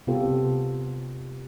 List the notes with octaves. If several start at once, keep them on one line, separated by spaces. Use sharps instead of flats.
C3 B3 F4 G4 A4